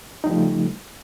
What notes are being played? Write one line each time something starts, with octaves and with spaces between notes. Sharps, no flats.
C#3 F3 G3 A3 D#4